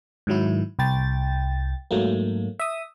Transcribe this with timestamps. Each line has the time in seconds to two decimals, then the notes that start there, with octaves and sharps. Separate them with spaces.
0.27 G#2 D#3 F#3 E4
0.79 C2 G5 A6
1.91 G#2 F#3 A3 A#3
2.60 E5 D#6